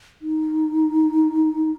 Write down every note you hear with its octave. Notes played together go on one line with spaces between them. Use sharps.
D#4